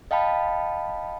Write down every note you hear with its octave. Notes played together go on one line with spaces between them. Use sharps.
D#5 F5 G5 A5 B5